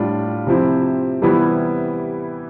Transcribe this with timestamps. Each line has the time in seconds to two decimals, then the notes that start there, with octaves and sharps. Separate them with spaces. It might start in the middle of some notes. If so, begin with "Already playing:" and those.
Already playing: A2 G3 D4 F4
0.47 C3 F3 C4 E4
1.22 C3 E3 G3 B3 E4